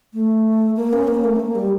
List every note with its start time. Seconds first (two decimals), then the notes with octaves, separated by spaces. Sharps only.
0.14 A3
0.76 A#3
0.93 C#4
1.08 A#3
1.24 A3
1.36 C#4
1.40 A#3
1.55 G3